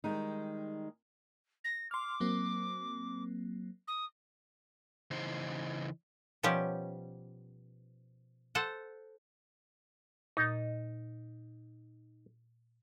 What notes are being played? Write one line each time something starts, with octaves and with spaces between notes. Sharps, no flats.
D#3 G3 G#3 D#4
A#6
C6 D6 F6
F#3 A#3 C4
D#6
C#3 E3 D#4 C5
B2 F3 G3 C#4 G4
A4 C5 F#5
A#2 D#4 A6